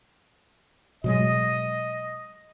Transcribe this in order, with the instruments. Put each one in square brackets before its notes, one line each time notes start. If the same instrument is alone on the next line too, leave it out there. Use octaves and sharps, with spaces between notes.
[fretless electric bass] B2 F#3 G#3 [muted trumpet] D#5